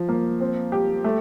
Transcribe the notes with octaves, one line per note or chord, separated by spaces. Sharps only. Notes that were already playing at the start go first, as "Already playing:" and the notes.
Already playing: F3
A#3
C4
G4
A3